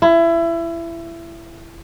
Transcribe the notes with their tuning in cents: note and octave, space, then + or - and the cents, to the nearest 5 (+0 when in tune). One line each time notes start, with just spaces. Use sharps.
E4 +25